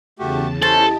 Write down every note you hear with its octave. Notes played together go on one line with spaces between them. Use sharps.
E2 C#3 A3 F#4 G4 A5
C#4 E4 G4 A4 C5 D#5 A5 C6